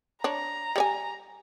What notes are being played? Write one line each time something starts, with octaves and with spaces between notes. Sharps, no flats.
D4 C#5 A#5
G3 C#5 G#5